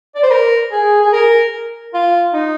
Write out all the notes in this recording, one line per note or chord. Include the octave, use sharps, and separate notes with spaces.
D5
C5
A#4
G#4
G#4
A#4
F4
D#4